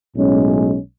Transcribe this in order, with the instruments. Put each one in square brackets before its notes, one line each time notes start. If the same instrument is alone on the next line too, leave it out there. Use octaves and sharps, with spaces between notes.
[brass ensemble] B1 A2 G#3 C#4